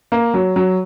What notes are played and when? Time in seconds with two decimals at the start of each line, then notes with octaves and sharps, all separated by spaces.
0.12 A#3
0.34 F#3
0.56 F#3